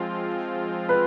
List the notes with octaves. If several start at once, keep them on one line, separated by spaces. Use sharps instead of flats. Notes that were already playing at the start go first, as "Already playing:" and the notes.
Already playing: F3 G#3 C4 F4
B4